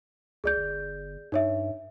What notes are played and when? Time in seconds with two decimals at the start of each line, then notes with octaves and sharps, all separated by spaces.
0.44 C#2 G#4 D5 G6
0.57 G1
1.32 G2 D#4 C#5 E5